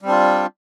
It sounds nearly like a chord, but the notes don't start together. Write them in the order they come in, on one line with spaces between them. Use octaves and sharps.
G3 C4 D4 F4